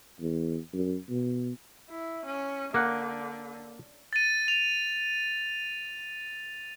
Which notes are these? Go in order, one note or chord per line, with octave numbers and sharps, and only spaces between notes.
E2
F#2
B2
E4
C#4
D3 A#3 F#5
A6 D#7
F7